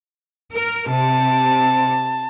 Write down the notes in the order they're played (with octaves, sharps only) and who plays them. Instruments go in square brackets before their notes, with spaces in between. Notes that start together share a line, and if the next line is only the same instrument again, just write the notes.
[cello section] A#4
[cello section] C3 [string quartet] A5